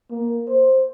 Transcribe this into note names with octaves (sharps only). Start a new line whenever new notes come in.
A#3
C5